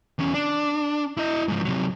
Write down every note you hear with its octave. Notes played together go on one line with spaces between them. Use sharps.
E2 C#4
D4
E4 D#5
G#2 F3
C3 F#3